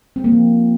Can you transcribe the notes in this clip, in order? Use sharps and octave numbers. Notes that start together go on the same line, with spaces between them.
C4
A#3
F3